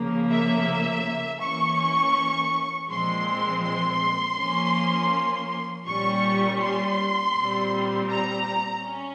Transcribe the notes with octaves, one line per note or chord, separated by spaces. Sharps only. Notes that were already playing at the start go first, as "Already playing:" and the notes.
Already playing: C#3 F3 A#3
E5
E3 A#3 C#4 C#6
A#2 F3 G#3 C4 C6
C6
F3 A#3 C#4
A#2 G3 C#4 C#6
C6
A#2 G3 C4
A#5
C#4